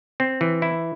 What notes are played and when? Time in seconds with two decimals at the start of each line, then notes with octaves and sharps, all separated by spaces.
0.20 C4
0.41 E3
0.62 E4